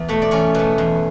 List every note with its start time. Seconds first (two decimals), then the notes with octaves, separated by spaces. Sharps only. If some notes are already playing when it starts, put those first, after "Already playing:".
Already playing: E2 B3
0.09 B2 A3
0.22 D5
0.31 E2 C#4 C#5
0.55 B2 A3
0.78 E2